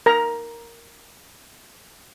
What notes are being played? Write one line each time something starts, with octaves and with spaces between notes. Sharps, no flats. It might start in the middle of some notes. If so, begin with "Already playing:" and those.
A#4 A#5